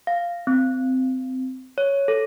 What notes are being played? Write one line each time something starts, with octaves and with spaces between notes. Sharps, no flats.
F5
C4
C#5
A4